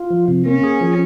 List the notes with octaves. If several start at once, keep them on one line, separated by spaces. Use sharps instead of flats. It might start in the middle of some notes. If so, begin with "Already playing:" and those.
Already playing: F4
F3
C3
A#3 C#4
G#4
F3